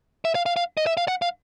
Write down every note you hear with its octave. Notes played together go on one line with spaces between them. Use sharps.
E5
F5
F5
F5
D#5
E5
F5
F#5
F5